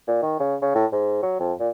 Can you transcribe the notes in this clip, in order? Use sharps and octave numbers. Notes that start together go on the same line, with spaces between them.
A#2
D#3
C#3
C#3
A2
G#2
F#3
F2
A#2